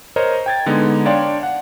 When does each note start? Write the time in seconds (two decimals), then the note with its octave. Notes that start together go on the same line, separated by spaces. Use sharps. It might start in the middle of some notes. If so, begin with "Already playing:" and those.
0.16 A#4 C5 C#5 D#5 A#5
0.46 G5 G#6 A6
0.66 D3 G#3 B3 D#4
1.05 D4 C#5 D5 F5 G5 C6
1.43 F#5